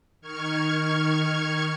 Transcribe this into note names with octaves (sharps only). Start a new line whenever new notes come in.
D#3 C#6 F6 G#6